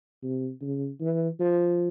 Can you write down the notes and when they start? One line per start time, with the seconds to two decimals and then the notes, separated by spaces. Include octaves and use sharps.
0.22 C3
0.62 C#3
1.01 E3
1.40 F3